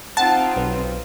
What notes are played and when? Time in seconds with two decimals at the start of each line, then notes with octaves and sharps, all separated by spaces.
0.17 C4 D#4 F4 F#5 A5
0.56 B1 B4